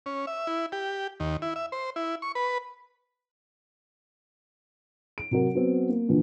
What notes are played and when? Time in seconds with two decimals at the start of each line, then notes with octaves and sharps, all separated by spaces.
0.06 C#4
0.27 E5
0.47 E4
0.72 G4
1.20 D#2
1.42 E4
1.56 E5
1.72 C5
1.96 E4
2.22 C#6
2.35 B4
5.18 D7
5.31 C3 F#3 A#4
5.55 F#3 B3 C4
5.89 A#3
6.08 A#2 D3 E3 F3